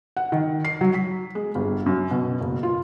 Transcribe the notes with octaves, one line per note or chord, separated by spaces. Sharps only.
F#5
D#3
C7
F#3
B6
G#3
G1
F#2
B2
F#1
F4